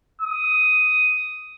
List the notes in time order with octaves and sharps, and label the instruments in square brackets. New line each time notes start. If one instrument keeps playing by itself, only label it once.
[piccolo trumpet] D#6